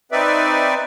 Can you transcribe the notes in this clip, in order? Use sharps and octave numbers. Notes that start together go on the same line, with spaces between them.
C4 D#4 B4 D5 E5